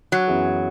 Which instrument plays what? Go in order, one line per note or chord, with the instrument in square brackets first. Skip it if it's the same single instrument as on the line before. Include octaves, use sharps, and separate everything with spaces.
[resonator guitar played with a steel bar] F#3
[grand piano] F#2 E3 B3 E4 G#4